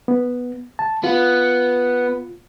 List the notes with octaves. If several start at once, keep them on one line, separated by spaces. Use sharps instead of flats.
B3
A5
B3 F4